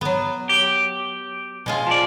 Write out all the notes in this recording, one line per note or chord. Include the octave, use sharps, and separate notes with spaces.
F#3 B3
G4
B2 G#3 F4
F3 D5